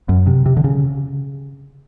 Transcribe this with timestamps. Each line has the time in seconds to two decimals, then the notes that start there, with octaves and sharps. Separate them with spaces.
0.09 F#2
0.27 C3
0.46 C3
0.57 D3
0.64 C#3